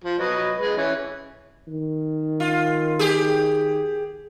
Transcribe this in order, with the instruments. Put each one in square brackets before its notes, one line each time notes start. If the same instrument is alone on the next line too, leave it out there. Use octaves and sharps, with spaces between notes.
[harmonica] F3
F#3 B4 D#5
G#3 B4
E3 C#4
[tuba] D#3
[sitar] F4
G4 G#4